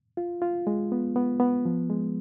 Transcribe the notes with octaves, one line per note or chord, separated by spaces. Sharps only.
F4
F4
G#3
B3
B3
B3
F3
G#3